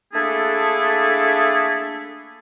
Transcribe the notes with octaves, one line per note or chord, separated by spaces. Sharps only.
A3 A#3 D4 E4 G#4 A4